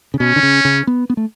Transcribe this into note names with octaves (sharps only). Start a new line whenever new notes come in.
C#3
B2 C#4
D3
C#3
C#3
B3
B3
A3